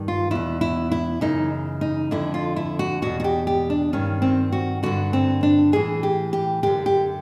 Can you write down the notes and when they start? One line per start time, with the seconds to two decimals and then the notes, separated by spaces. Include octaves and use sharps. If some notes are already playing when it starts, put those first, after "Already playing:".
Already playing: G2 D#3
0.08 F4
0.31 E2 B2 E4
0.61 E4
0.92 E4
1.21 F#2 C#3 E3 D#4
1.81 D#4
2.11 F2 D3 E4
2.34 F4
2.56 E4
2.79 F#4
3.02 E2 B2 F#4
3.20 F#4
3.24 G4
3.47 G4
3.70 D4
3.93 G2 D#3 C#4
4.22 C4
4.52 F#4
4.83 G2 D3 F#4
5.13 C4
5.43 D4
5.72 A2 E3 G#4
6.03 G4
6.33 G4
6.63 F#2 D3 G4
6.86 G4